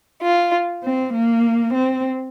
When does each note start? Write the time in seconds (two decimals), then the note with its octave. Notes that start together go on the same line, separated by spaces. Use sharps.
0.22 F4
0.83 C4
1.12 A#3
1.72 C4